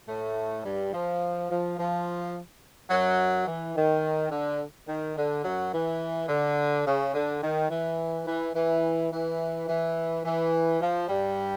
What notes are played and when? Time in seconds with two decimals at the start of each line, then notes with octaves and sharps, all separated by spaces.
0.08 A2 A3
0.65 G2 G3
0.93 F3
1.50 F3
1.78 F3
2.90 F#2 F#3
3.47 E3
3.75 D#3
4.31 D3
4.88 D#3
5.17 D3
5.44 F#2 F#3
5.74 E3
6.29 D3
6.86 C#3
7.14 D3
7.42 D#3
7.70 E3
8.27 E3
8.55 E3
9.12 E3
9.69 E3
10.25 E3
10.81 F3
11.09 G2 G3